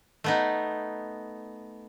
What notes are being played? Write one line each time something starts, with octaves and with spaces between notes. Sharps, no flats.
A3 B3 D#4